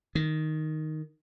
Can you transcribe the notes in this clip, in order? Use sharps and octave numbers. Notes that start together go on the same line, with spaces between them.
D#3